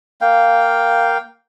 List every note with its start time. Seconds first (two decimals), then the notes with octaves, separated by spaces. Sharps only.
0.21 A#3 F5 G5